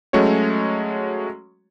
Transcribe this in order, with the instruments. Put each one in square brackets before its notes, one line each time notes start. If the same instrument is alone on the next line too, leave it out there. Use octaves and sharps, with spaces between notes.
[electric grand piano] F#3 G#3 A3 C#4 F#4 C#5